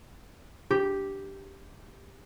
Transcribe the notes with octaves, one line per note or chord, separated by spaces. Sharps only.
G4